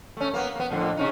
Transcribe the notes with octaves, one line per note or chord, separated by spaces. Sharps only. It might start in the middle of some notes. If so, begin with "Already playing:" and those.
A3 C#4
A#3 B3
A#3 B3
F2 A2 D3
C3 C#4 D#4